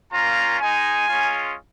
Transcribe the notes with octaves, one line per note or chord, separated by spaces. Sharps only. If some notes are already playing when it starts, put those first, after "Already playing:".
A#3 C#4 F4 A#5
G#3 D#4 G#5
G#3 C#4 F4